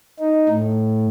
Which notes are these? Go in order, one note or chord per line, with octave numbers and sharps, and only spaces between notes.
D#4
A2